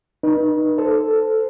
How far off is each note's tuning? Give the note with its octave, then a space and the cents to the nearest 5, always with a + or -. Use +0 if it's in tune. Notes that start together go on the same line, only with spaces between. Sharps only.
D#4 -25 B4 -45
A4 +0 C5 -15